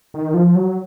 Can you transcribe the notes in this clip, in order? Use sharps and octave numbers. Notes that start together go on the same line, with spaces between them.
D#3
F3
F#3